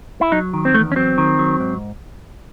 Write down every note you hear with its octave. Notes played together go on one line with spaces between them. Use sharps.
E4
F#3 D#4
D#3
C4
E2 A3
C#4
F#3 C4
D#3
F#3
G#2